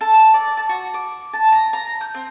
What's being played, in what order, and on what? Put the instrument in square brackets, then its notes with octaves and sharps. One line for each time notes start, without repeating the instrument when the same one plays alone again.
[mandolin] A4
D5
A5
F#4
D6
A5
A#5
A#5
G6
C4